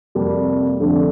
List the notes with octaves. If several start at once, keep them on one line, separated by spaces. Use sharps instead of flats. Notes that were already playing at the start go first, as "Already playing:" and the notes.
F2 C3 G3 A#3
F2 D3 F3 A3 D4